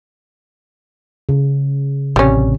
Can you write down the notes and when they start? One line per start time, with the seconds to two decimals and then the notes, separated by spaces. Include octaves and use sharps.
1.29 C#3
2.16 A1 C3 G3 C#4